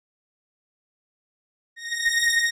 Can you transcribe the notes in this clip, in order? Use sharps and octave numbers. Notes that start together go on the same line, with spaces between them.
A#6